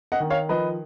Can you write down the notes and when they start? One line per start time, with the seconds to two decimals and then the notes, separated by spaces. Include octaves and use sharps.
0.12 D#5 F#5
0.20 D#3
0.30 C#5 F5
0.49 F3 B4 D#5